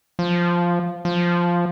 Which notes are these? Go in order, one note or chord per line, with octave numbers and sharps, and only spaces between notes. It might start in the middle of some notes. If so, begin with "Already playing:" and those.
F3
F3